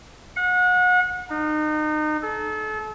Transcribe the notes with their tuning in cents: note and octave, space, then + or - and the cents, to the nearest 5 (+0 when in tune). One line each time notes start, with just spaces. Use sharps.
F#5 -35
D#4 -30
A4 -35